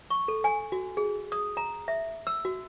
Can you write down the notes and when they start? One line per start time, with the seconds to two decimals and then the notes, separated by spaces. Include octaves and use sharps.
0.10 C#6
0.28 A4
0.44 G#5
0.72 F#4
0.97 G#4
1.32 D#6
1.57 A#5
1.88 E5
2.27 E6
2.45 F#4